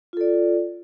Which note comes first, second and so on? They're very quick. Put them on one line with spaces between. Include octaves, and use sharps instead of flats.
F4 A4 D5